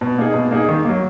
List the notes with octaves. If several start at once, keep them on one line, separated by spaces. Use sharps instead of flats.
B2
A#3 D#4 G#4
B2
A#3 D#4 G#4
D#3
F#3 A#3